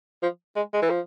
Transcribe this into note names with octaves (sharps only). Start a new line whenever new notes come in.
F3
G#3
G#3
E3
F3